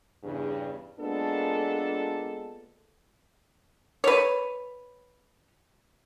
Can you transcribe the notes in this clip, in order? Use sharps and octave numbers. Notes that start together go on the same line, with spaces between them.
E2 G2 C#3
G#3 A#3 B3 D4 F4 A4
B4 C#5